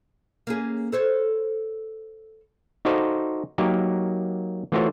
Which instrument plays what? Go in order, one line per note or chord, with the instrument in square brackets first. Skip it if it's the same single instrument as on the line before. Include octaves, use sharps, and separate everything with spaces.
[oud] A#3 C#4 G#4
A4 C5 C#5
[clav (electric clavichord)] D#4 F#4 A4 C5 D5 F5
F#3 A#3 D#4 G4 A#4
E3 A3 F4 F#4 C5 C#5